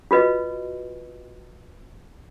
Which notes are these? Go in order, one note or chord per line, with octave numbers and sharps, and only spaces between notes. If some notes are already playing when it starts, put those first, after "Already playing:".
F4 F#4 B4 D#5